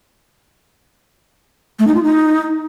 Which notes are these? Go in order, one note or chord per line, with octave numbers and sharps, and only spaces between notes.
A3
D#4
F4
D#4